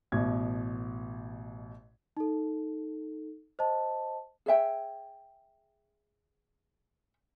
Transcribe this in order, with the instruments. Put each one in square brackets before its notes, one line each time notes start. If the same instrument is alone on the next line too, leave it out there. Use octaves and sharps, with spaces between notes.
[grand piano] A1 B2 G#6
[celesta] D#4 A4
C5 D#5 A5
[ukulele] G#4 C#5 E5 G5